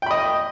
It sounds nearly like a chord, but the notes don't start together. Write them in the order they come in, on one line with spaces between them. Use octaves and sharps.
G5 B5 D#5